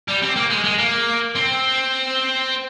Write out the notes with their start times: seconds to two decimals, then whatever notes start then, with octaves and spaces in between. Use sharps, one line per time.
0.08 G3
0.22 C4
0.36 A#3
0.50 G#3
0.64 G#3
0.78 A#3
1.35 C4